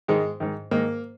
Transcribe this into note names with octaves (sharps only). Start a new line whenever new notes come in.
G#2 D#3 G#3
G#2 D#3
G#2 D#3 A#3